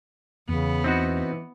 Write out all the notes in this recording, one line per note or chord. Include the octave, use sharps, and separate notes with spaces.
E2 C#3 B3
E3 C4 D#4 F#4